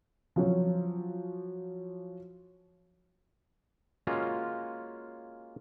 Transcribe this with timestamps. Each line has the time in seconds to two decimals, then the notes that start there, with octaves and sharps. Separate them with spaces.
0.36 F3 F#3 C#4 C#5
4.07 G#3 A#3 C#4 F4 F#4